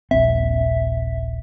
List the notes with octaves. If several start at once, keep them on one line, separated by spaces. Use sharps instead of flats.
D#1 A#1 C4 E5